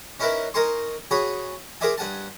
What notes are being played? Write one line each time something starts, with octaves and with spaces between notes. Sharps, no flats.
C#4 D#4 E4 A#4 B4 E5
D#4 A#4 C5 G#5 C6 C#6
F#4 G#4 C#5 G#5 B5
G#4 A#4 C5 D5 E5 G#5
G2 F#5 G#5 A5